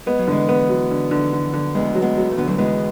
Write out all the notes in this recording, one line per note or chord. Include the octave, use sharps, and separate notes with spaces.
G#3 B3
F#3
D3 E3 G#3
B3
F#3
D3
D3
D3
D3
D2 G#3 B3
F#3
G#3 B3
F#3
A3
D3 B3
F#3 A3
E3 G#3 B3